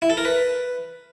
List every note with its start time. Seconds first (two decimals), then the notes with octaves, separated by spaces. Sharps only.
0.02 E4
0.10 A4
0.17 A#4
0.25 B4